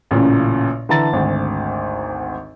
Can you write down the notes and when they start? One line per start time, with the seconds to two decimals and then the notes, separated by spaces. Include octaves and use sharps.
0.11 A1 A#2 C#3
0.89 D3 E3 E5 A5 A#5 A6
1.13 G#1 D2